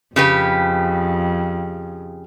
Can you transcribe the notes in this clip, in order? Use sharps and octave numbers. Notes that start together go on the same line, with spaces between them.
F2 C#3 G4 B4